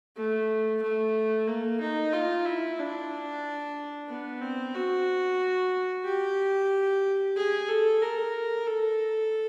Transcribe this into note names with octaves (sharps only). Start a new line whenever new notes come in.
A3
A3
A#3
D#4
F4
E4
D4
B3
C4
F#4
G4
G#4
A4
A#4
A4